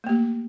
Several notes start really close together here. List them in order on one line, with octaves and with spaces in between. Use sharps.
A3 A#3 G4